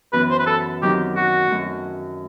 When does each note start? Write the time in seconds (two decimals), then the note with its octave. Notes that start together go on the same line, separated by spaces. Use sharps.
0.13 F#2 E3 B3 E4 B4
0.30 C5
0.39 B4
0.47 A4
0.82 D#3 F#3 C4 D#4 G4
1.16 F#4
1.50 F#2 D#3 F#3 A3 C4